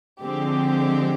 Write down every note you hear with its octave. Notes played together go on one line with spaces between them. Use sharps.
D3 F3 G#3 C4 G4